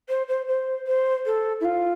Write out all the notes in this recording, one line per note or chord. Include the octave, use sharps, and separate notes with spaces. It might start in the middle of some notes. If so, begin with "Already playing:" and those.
C5
C5
C5
C5
A4
E4
F4